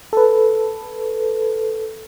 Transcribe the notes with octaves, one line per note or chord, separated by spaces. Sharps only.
A4 B4